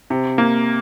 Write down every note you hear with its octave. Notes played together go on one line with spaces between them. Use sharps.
C3
A#3